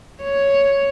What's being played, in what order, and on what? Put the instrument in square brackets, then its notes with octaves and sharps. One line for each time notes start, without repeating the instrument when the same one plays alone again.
[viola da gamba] C#5